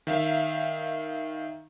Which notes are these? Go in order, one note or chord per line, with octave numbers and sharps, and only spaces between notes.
D#3 E5 F5